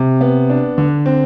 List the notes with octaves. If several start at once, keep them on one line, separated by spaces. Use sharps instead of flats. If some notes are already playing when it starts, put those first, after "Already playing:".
Already playing: C3
B3
D4
D3
C4